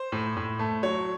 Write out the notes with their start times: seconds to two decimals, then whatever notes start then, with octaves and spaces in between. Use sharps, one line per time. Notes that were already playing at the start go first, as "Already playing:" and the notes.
Already playing: C5
0.12 A2
0.37 A2
0.59 A3
0.83 F#3 C#5